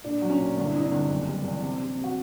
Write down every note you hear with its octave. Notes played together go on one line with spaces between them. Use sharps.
A#2 D4
F#3
C#4
A#2
G1 D4
E4
C3 D#4
D4
G1
F#1
G3
E2
C3
C3
C3
F#4